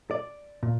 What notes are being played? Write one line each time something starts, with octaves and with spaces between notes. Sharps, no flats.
D5
A#2